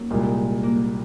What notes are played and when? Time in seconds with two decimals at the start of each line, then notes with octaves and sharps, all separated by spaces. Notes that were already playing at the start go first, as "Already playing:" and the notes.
Already playing: F#3 A#3 C#4 D#4
0.10 C2 A#2 G#3
0.63 A#3